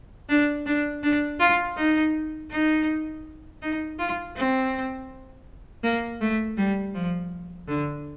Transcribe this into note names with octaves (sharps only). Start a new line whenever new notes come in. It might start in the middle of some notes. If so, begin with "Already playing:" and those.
D4
D4
D4
F4
D#4
D#4
D#4
F4
C4
A#3
A3
G3
F3
D3